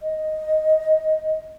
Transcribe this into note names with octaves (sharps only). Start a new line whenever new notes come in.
D#5